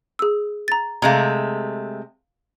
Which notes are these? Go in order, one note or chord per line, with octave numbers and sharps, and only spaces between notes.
G#4 E6
A#5 A6
C3 G#3 A3 F5 A#5